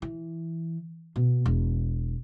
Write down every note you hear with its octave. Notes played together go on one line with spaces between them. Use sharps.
E3
B2
E1